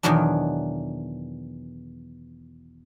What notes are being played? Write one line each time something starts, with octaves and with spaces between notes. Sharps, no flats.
E2 B2 D#3 F#3 B3 D4